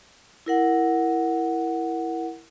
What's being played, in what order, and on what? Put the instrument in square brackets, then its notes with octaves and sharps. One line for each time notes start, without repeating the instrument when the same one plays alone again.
[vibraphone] E4 A#4 F#5